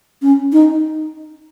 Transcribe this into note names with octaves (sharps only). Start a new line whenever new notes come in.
C#4
D#4